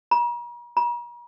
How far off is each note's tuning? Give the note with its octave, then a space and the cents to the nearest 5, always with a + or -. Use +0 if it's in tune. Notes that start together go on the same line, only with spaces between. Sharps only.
A#5 +45
A#5 +45